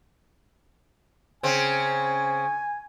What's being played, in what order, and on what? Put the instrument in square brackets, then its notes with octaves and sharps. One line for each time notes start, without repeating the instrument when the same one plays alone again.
[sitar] C#3 C4 [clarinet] G#5